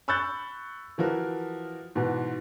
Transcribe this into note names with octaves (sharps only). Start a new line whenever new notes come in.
B5 C#6 E6 F#6 G6 A6
E3 F3 F#4 A#4
G#2 B2 E3